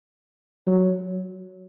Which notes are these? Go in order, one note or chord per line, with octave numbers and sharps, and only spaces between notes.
F#3